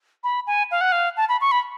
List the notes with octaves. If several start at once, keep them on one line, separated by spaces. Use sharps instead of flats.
B5
G#5
F5
F#5
F5
A5
B5
C#6
B5